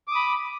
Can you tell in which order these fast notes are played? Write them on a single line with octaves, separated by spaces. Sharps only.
D6 D#6 B5